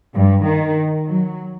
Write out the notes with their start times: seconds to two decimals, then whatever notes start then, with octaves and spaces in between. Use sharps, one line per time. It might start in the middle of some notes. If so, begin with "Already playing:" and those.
0.14 G2
0.45 D#3
1.06 F#3